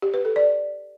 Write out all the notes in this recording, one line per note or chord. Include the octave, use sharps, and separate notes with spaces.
G4
B4
A4
D5